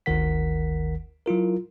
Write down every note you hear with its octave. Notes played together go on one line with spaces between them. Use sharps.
G1 D2 D#3 A#4 F#5 B6
F#3 E4 F4 A#4